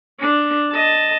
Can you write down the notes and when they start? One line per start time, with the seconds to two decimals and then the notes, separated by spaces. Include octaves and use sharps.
0.20 D4
0.72 D#5 A5